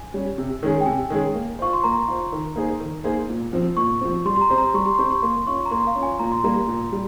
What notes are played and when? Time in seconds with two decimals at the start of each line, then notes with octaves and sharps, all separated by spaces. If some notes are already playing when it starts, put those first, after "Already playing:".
Already playing: G#5
0.14 G3 C#4
0.38 C3
0.63 D#3 G#3 C#4 G#4
0.81 G5
0.86 C3 G#5
1.10 D#3 G#3 C#4 G#4
1.35 A#3
1.59 F4 C5 C#6
1.73 C6
1.84 A#3 A#5
2.08 F4 C5
2.32 D#3
2.56 A#3 D#4 G#4 C5
2.80 D#3
3.04 A#3 D#4 G#4 C5
3.29 A#2
3.53 F3 C4
3.77 A#2 C#6
4.01 F3 C4
4.25 G3 C6
4.36 C6
4.41 A#5
4.50 C4 G4 C5
4.58 A#5
4.74 G3 C#6
4.86 C6
4.99 C4 G4 C5 C#6
5.11 C#6
5.23 A#3 C6
5.47 C#4 F4 C#6
5.66 A#5
5.71 A#3 C6
5.87 F5
5.95 C#4 F4
6.03 G#5
6.19 A#2 A#5
6.32 C6
6.44 G3 A#3 A#5
6.67 A#2
6.92 G3